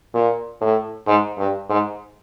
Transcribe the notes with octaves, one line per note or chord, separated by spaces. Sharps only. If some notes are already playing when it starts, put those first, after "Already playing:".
A#2
A2
G#2
G2
G#2